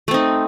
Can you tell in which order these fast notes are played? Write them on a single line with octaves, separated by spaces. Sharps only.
A3 C4 D#4